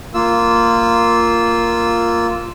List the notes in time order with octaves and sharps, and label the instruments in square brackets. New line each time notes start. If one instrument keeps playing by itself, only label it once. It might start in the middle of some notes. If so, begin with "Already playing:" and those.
[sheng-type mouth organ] A#3 F4 E6